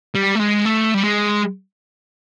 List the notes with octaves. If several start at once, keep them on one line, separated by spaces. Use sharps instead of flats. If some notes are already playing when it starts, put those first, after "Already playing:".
G3
A3
G#3
A3
G3
G#3